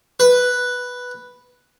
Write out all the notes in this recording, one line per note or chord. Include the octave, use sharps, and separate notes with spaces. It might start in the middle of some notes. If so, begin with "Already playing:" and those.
B4